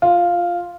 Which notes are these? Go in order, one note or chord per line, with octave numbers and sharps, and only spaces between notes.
F4